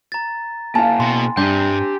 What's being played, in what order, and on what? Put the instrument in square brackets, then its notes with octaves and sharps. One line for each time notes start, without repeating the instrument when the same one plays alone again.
[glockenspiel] A#5 A6
[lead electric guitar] A#3 E4 [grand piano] F5 A5 [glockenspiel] G#5
[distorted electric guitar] B2 [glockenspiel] C6
[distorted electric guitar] G2 [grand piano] D4 [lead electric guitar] G4 C6 [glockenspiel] G6